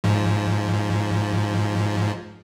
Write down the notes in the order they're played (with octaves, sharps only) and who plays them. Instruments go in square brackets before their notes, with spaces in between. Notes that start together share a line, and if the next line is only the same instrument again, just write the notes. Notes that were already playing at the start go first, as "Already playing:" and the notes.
[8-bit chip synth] G#2 F3